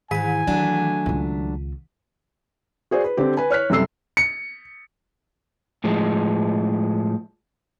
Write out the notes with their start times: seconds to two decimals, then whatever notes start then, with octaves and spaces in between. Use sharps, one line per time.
0.11 G#2 D#3 E3 G#5 B6 D#7
0.47 E3 F#3 A3 D4
1.06 C#2 F4
2.91 F#4 G#4 C5 D5
3.04 B4
3.17 D3 C4 G4
3.37 B4 G#5
3.50 C#5 F6 F#6 B6
3.70 F#1 C3 G3 A4 E6 C7
4.17 C#7
5.84 A2 F3 G#3